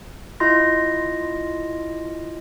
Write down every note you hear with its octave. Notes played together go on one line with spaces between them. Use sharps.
E4 F4 D#5 C6 A#6